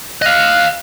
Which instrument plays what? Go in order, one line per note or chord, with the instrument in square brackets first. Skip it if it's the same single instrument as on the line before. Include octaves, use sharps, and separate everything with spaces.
[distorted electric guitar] D#5 F5 [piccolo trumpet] F#6